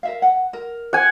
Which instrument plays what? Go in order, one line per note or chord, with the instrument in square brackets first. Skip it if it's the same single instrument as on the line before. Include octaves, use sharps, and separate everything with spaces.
[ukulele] A#4 E5 F5
F#5
A#4
[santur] F#5 G#5